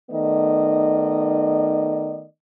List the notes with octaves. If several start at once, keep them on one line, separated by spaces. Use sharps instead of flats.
D#3 A3 B3 D#4 D5 D#5